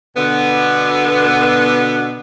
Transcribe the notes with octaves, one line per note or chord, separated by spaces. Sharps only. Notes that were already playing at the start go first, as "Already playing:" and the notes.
B2 D3 B3